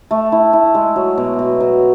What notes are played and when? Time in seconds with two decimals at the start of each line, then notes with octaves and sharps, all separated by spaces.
0.11 A3
0.32 E4
0.53 E4
0.74 G#3
0.96 F#3
1.18 B2
1.39 B2
1.60 F#3